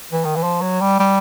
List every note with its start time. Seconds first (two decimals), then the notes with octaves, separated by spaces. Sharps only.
0.13 E3
0.25 D#3
0.36 E3
0.43 F3
0.62 F#3
0.81 G3
0.99 G3